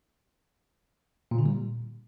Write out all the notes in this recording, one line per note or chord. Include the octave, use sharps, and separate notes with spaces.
A#2
D3
G3
A#2